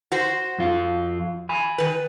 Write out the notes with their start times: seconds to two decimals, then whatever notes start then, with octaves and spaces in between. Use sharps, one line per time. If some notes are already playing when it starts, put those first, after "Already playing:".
0.12 F#4 C5
0.58 F2 F4
1.49 G#5 B5
1.78 D#3 B4